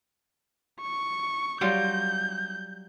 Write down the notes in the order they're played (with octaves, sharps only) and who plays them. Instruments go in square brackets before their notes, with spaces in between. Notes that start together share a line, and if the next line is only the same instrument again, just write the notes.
[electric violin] C#6
[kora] F#3 G3 F4 [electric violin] G6